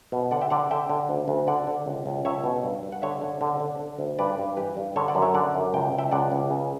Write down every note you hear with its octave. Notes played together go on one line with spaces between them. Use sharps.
B2
D3 D5 F#5
E5 G5
D3 D5 F#5
D3 E5 G5
D3
D2
D2
D3 D5 F#5
D3
C#2
C#2
C#2 C#5 E5
B2
G2
G2
F#5
D3 C#5 E5
D3
D3
D3
D3
D2
G2 B4 D5
G2
E3 G4 B4
G2
D3 A4 C#5
D5 F#5
F#2
C#5 E5
D3 D5 F#5
F#2
C#2 G5
C#2
E5 G5
C#2 D5 F#5
C#2
C#3